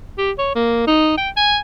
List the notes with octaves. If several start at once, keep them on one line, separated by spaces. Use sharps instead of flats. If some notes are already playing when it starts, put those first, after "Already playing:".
G4
C#5
A#3
D#4
G5
G#5